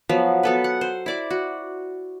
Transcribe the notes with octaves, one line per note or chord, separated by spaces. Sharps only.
F3 F#3 B3
B3 A4 B4
F#5
C5
E4 D5 D6
F#4